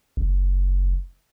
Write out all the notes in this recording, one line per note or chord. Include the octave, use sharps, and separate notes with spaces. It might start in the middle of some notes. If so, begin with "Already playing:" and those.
F#1